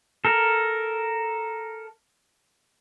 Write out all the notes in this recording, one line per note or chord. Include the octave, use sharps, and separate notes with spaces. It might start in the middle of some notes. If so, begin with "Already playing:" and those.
A4 A#4